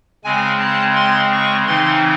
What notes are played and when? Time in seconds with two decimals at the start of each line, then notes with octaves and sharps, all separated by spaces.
0.24 C#3 G#3 C4 G#5
0.60 A5
0.96 C6
1.32 C#6
1.67 C#3 E3 C4 D#4 C6